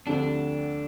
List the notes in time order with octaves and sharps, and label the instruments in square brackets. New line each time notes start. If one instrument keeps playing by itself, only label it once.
[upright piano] D2 D3 F3 C4 G4 [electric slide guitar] D4